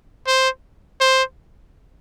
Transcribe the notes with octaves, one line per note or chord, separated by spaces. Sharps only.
C5
C5